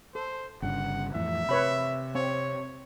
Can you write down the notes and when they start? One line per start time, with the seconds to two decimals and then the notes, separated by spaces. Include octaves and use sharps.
0.15 A4 C5
0.62 G1 G2 C#3 F#5
1.14 F2 A2 E3 E5
1.49 C3 B4 C#5 B5
2.15 C4 C#5